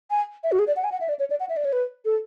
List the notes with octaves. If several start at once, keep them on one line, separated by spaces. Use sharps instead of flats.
G#5
E5
F#4
G#4
D5
F#5
G#5
F#5
E5
D5
C#5
D5
F#5
E5
D5
C#5
B4
A4